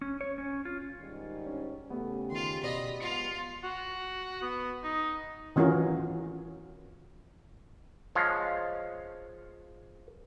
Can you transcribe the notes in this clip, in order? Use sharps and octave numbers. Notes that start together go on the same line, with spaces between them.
C#4
C#5
C#4
F4
G#2 D#3 G3
C#4
C#3 A3 B3 G4
D#3 F4 C6
B2 D5 D#5 B5
F#3 G#3 B3 F4 F5 C#7
F#4
B3
D#4
D#3 E3 C#4 F4 F#4 A#4
F3 G#3 C#5 F5